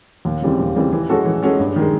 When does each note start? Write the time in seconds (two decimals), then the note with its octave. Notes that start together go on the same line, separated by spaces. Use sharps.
0.25 D#2
0.42 C#3 E3 G3 C4
0.59 D#2
0.76 C#3 E3 G3 C4
0.93 E3
1.09 G#3 C#4 F#4 A4
1.26 E3
1.43 G#3 C#4 F#4 A4
1.60 G2
1.76 D#3 G#3